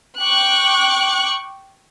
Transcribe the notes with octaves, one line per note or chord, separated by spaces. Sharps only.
G5 C#6 D6 F#6